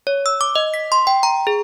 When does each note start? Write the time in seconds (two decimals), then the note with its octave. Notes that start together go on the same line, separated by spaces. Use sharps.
0.07 C#5
0.26 E6
0.41 D6
0.55 D#5
0.74 B6
0.92 C6
1.07 G5
1.23 A#5
1.47 G#4